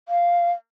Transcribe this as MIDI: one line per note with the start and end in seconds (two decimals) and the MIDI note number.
0.08 0.52 77